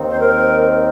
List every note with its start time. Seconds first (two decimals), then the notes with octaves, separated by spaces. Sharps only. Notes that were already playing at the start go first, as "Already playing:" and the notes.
Already playing: D#2 D#3 C4 D#4
0.10 C5
0.20 A#4